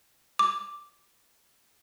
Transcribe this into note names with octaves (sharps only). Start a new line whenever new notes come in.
D6